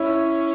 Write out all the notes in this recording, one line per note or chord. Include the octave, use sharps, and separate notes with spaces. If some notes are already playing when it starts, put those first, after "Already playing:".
Already playing: C#4 E4